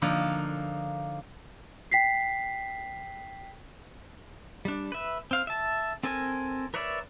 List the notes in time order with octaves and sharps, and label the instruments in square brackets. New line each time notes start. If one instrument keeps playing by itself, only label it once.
[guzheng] D3 F3 A#3 D#4
[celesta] G5 B6 C7
[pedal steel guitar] G3 D4
B4 E5
C4 F5
E5 A5
C4 A4 A#4 G#5
A#4 B4 C#5 D5 E5